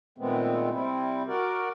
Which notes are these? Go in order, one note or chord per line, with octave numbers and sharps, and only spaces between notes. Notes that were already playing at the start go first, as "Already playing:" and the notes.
A#2 D#3 G#3 A3 B3 C4
C3 G3 C4 E4
F#4 A#4 D5